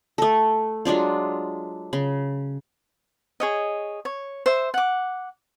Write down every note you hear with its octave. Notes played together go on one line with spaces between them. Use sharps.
A3 A4
F#3 G#3 D4 F4
C#3
G#4 C#5 D#5
C#5
C5 E5
F#5 D6